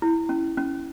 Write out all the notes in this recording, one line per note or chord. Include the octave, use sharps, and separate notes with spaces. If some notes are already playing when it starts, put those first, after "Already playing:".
E4
C#4
C#4